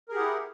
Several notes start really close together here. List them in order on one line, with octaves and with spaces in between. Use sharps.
A#4 G#4 G4 F#5 E4